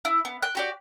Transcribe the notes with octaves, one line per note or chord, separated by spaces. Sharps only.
E4
B3
G5 F#6
F#4 G4 D5